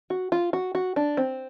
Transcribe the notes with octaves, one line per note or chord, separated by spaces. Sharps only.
F#4
F4
F#4
F#4
D4
C4